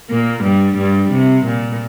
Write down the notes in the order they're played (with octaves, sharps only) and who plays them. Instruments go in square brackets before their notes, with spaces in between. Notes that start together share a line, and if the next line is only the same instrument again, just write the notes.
[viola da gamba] A#2 A#3
G2 G3
G2 G3
C3
A#2